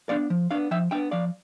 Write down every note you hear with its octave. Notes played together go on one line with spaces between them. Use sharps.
B3 D4 D5 F5
F3
B3 D4 D5 F5
F3 E5 G5
B3 D4 E5 G5
F3 D5 F5